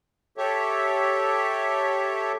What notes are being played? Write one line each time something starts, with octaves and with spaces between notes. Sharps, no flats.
G4 A4 C#5 E5